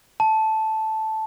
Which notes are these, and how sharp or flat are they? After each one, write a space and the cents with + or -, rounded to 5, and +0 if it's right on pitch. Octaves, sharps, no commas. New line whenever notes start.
A5 -5